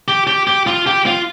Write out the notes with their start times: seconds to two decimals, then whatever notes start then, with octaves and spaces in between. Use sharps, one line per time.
0.08 G4
0.27 G4
0.47 G4
0.67 F4
0.87 G4
1.06 F4